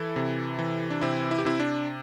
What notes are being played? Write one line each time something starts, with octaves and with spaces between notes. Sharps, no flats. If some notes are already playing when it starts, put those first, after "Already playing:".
Already playing: E3 E4 A4
C3
E3
D4
C3 C4 E4
E4
G4
C3 C4 E4
D4